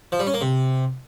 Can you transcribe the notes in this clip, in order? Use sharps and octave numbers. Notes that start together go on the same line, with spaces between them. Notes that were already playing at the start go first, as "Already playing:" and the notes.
F3
G3
C#4
A#3
C3